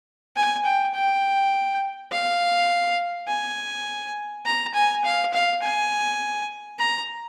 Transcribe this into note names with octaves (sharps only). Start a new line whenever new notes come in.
G#5
G5
G5
F5
G#5
A#5
G#5
F5
F5
G#5
A#5